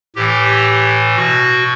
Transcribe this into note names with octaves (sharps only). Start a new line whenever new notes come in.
A2 E3 G4
B2 F#4